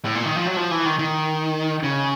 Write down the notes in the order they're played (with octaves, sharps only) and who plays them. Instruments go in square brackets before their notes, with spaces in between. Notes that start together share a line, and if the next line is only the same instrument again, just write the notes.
[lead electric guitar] A2
A#2
D#3
F3
F#3
F3
E3
D#3
D#3
C#3